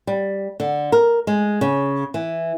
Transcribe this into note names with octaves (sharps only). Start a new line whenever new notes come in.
G3
D3
A#4
G#3
C#3
E3